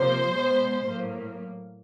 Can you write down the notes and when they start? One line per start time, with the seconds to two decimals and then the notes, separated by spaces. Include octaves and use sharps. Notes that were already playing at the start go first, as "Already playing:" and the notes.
Already playing: C3 F3 A#3 C5
0.31 B2 G#3 B3
0.85 A2 F#3 A#3